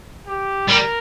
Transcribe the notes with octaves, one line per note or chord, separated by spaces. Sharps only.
G4
G3 A#4